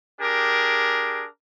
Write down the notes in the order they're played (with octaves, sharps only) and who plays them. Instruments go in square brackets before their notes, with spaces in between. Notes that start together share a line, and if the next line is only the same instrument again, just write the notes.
[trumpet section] D4 G4 G#4 A#4